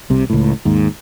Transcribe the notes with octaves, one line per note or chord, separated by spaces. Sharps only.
C2 C3
C#2 A2
D#2 G#2